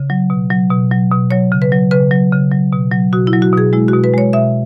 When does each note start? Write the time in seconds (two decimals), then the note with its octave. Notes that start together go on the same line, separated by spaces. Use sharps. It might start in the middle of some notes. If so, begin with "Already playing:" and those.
Already playing: C#3
0.10 F#3
0.30 B2
0.51 F#3
0.71 B2
0.91 F#3
1.11 B2
1.31 F#3 C#5
1.52 C#3
1.62 B4
1.72 F#3
1.91 C#3 B4
2.11 F#3
2.32 C#3
2.52 F#3
2.73 B2
2.92 F#3
3.13 B2 F#4
3.27 E4
3.33 F#3
3.42 F#4
3.53 B2 G#4
3.73 G#3 E4
3.88 B2 F#4
4.04 B4
4.14 G#3 C#5
4.33 B2 E5